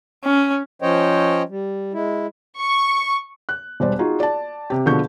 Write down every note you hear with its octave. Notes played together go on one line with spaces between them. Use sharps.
C#4
F3 C#4 C5 C#5 D#5 G5
G3
G#3 E4
C#6
F#6
E1 G3 C5 D5
D#4 F4 F#4 G#4
D5 A5
C3 G4
B2 D3 F3 G#4 C#6 G6